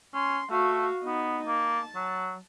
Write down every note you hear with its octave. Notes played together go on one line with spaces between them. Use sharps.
C#4 C6
A3 F#4 F5
B3 D#4
A#3 A5
F#3